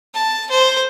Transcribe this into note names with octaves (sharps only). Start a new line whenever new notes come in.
A5
C5